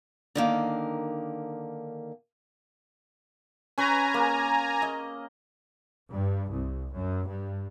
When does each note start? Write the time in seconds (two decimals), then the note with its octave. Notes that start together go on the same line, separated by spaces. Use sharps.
0.35 D3 D#3 A#3
3.78 C#4 B4 G#5 A#5
4.14 A#3
4.82 D#5
6.10 G2
6.50 C2
6.93 F#2
7.27 G2